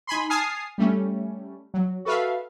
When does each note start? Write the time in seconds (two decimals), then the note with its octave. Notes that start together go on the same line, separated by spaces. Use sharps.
0.07 D#4 G#5 B5 C6
0.30 G#5 A5 D#6 F6 C7
0.78 G3 A3 C#4
1.74 F#3
2.05 F#4 A4 B4 E5 F5